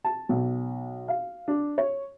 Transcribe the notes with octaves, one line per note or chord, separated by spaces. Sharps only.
A5
B1
F5
D4
C#5